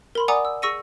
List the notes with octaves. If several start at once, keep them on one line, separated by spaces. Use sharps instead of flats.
A#4 B5 C6
D5 F#5 G#5 A#5 D6 D#6
E6
G#4 C#6 E6 A#6 C#7 D#7